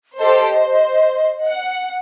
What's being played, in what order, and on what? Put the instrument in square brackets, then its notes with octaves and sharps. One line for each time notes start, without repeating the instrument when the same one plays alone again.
[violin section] G4 A4 C5 [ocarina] D#5
[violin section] C5
F#5